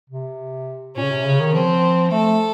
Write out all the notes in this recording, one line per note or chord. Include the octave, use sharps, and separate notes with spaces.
C3
A#2 C#4
C#3
C3
C#3
D#3
F3 C4
A3 A4